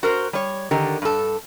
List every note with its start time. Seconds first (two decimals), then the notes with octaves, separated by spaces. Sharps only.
0.03 F#4 A#4 C5
0.33 G3 C#5
0.71 D3 D#3 G4 A#4
1.02 G2 A4